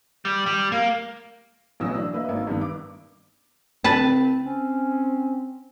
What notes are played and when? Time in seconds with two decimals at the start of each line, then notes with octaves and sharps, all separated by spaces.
0.25 G3
0.46 G3
0.72 A#3
1.80 A1 B2 E3 F#3 D#6 E6
1.94 D4
2.13 A#3 B4 D#5 E5
2.29 G#1 A#3
2.47 G2 D#3 B3
2.61 D6
3.84 C2 C#3 C4 B4 A5
4.43 C4 C#4